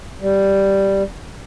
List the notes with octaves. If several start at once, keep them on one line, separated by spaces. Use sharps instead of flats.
G3